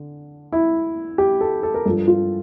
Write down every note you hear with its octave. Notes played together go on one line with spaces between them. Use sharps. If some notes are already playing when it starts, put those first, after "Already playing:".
Already playing: D3
E4
G4
A4
A4
A#4
G2 F3 A4
F4